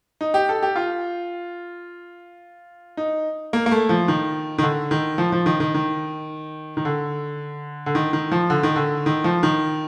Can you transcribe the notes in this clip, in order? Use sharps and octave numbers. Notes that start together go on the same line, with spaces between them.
D#4
G4
A4
G4
F4
D#4
A#3
A#3
A3
F3
D#3
D#3
D3
D#3
F3
F3
D#3
D#3
D#3
D#3
D3
D3
D#3
D#3
F3
D3
D#3
D3
D#3
F3
D#3